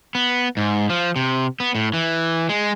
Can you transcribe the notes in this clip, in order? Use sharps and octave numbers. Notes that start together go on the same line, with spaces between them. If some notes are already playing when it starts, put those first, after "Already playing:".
B3
G#2
F3
C3
B3
A2
E3
G#3